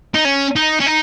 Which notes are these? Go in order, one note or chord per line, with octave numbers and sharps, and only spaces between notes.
D#4
C#4
D#4
C#4
D#4